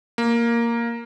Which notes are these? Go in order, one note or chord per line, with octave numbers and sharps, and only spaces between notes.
A#3